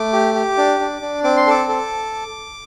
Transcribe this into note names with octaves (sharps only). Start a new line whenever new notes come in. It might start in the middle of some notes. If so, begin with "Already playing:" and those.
Already playing: A3 D6
G4
G4
D4
D4
D4
C4 D6
C6
A4 D6
A4